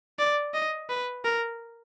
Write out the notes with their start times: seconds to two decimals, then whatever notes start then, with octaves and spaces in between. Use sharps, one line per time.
0.19 D5
0.54 D#5
0.89 B4
1.24 A#4